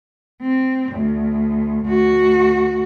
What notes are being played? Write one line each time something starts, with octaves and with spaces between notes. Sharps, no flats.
C4
D2
D2 F#4